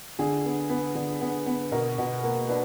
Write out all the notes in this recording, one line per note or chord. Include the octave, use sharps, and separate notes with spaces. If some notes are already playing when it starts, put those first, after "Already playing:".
D3 G#4
B3
B3
D3
B3
B3
B2 A#4
B2
A#3
D4 B4